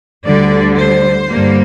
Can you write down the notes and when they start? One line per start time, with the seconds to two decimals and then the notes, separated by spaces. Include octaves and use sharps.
0.26 D2 D3 G3 D5
0.78 C5
1.28 G2 D3 G3 A#3